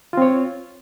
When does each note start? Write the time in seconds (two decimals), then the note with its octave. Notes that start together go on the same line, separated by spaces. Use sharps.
0.13 F4
0.17 C4
0.22 C#5